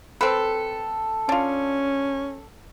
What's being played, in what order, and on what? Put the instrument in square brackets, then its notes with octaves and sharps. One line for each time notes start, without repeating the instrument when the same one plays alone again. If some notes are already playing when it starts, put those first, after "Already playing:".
[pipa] C4 B4 [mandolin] A4
[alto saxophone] C#4 [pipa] D4 F4